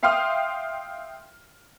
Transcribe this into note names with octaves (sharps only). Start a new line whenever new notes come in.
E5 F5 G5 C6 D#6 F6